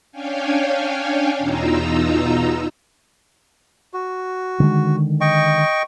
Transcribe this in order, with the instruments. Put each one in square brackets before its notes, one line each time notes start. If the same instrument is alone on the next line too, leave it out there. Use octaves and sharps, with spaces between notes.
[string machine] C#4 D4 C#5 F5 G5 G#5
E2 B2 D#4 F4 A#5 E6
[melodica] F#4
[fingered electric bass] D3 D#3 G#3
[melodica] D#5 G5 C#6